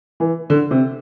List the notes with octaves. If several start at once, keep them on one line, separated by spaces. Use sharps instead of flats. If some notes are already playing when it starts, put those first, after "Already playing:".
E3
D3
C3